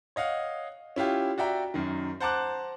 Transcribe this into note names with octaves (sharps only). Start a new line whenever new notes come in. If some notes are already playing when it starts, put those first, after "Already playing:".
C#5 D#5 F5 F#5
C#4 E4 F4 G4
F#4 D5 E5 G5 A#5
F#2 D#3
C5 F#5 A5 A#5 D6 F#6